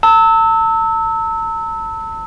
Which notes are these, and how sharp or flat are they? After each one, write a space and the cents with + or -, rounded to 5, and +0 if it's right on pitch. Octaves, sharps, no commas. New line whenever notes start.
A5 +40 E6 -20